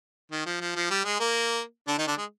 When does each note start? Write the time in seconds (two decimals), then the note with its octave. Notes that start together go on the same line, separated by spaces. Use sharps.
0.32 D#3
0.46 F3
0.61 F3
0.76 F3
0.90 G3
1.05 G#3
1.20 A#3
1.87 D3 D4
1.98 D#3 D#4
2.07 D3 D4
2.17 G#3